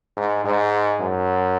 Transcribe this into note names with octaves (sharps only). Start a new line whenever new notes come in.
G#2
G#2
F#2